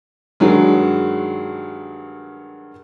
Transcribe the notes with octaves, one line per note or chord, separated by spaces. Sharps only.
G2 D#3 F#3 G#3